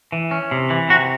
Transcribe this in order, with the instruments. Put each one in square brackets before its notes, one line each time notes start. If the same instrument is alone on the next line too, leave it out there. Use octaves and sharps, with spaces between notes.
[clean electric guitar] E3
C#4
C3
E3
C3 F#4